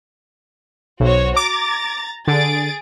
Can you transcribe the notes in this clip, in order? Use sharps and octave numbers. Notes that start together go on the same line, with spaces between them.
B1 F#4 C5 C#5
A#5 D6 A6
D3 G#4 A6 D7